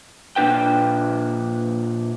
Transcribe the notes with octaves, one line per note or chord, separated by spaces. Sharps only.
A#2 D4 B4 G5